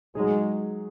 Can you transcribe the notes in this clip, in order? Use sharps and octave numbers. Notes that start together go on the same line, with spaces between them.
F#3 G#3 D#4 G#4